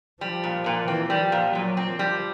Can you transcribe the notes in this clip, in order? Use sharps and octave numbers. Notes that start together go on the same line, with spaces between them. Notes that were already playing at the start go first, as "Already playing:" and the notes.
F3 G3
A#2
A#2
E3 C4
G3
F3
A#2
A#2 F#3
C4
F3
G3